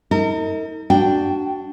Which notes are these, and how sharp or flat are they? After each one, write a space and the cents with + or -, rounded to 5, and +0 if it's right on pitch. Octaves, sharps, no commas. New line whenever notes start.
D#4 +35 A#4 -40
D4 +0 F#4 +15 G5 -5